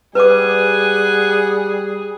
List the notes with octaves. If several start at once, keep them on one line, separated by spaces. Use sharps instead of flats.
G3 G#4 B4 F#5 G#5 D6